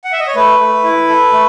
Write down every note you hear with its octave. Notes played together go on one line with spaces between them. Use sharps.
F#5
E5
D#5
C#5
A3 B4
A3
E4
A4
A3